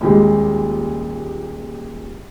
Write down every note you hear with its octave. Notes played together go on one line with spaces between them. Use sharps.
D#1 A#2 G#3 G4